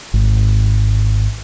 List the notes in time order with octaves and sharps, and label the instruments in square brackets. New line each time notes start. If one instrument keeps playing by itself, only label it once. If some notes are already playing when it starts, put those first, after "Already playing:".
[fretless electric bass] G#1